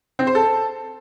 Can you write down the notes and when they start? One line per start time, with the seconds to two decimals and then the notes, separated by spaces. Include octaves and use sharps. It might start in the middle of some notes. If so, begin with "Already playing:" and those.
0.19 C4
0.27 C5
0.35 A4